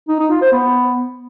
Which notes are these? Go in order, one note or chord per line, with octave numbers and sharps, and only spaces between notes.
D#4
D#4
F4
C5
B3